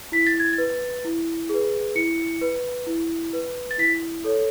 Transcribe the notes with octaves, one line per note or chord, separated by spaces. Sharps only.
E4 B6
A6
G#6
B4 A6
E4
G#4 B4
E4 C#7
B4
E4
B4
A6
E4 B6
A4 C#5